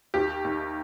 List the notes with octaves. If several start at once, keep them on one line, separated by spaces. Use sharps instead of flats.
D#2 G4
D#2